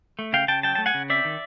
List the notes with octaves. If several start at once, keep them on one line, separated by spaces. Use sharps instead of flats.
A3
C#3 F5 G5
C#3 G5 A5
F#3 G5 A5
A3 A5
F#5 G#5
C#3
C4 D5 E5
D#3